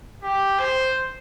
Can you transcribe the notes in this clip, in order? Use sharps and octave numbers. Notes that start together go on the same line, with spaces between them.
G4
C5